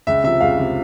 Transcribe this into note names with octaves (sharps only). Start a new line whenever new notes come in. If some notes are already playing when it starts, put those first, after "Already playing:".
C#2 E5
C3 F3 E5
C#2 F5
C3 F3